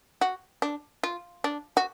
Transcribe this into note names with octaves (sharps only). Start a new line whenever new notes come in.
F#4
D4
F4
D4
F#4